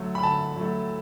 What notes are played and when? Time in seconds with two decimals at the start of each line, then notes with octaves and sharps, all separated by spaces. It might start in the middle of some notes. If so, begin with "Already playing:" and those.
Already playing: D3 F#3 A3
0.15 B5
0.23 D3 A5
0.56 F#3 A3